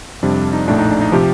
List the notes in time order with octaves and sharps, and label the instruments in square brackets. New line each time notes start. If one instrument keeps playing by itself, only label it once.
[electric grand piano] F2 C3 G3 D4
D#4
A#1 A2 A3 D4
D#4
D4
D#4
C3 F3 G4